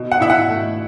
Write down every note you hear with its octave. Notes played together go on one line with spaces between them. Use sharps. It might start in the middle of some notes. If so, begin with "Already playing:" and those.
Already playing: B2 D#4
F#5
E4 E5
F#5
A3